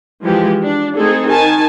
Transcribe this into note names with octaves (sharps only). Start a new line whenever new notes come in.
E3 F3 G#3 G4
D4
A3 C4 D#4 G#4 A4
D#3 G#5 A5